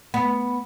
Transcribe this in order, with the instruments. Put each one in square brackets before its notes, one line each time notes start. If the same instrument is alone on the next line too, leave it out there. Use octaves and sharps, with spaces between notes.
[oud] B3